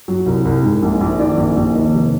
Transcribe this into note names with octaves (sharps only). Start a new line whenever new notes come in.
F#3
C2
C2
G#2
A#1
A#1
D#3 D5
A#1
A#1
D#2 D#5
F1